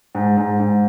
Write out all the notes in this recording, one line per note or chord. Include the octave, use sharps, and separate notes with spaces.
G#2
G#2
G#2